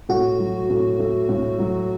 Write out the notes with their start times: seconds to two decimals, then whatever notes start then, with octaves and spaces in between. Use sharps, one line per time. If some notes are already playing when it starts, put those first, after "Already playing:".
0.09 A2 F#4
0.39 F#3
0.70 A2
0.99 A3
1.29 A2
1.59 F#3